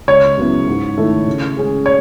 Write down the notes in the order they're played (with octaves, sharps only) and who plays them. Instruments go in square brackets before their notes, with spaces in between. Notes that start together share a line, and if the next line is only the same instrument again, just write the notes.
[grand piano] C#2 [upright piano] C#5
[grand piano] C#3 F#3 B3 E4
G#2
D#3 A3 E4 A4
C#3
G#3 C#4 G#4
[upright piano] C#5